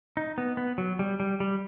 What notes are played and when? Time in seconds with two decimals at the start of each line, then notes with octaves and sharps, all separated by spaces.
0.17 D#4
0.38 B3
0.57 B3
0.78 F#3
0.99 G3
1.20 G3
1.40 G3